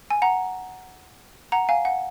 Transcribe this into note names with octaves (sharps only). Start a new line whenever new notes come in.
G#5
F#5 A#5
F#5 A#5
F5 G#5
F#5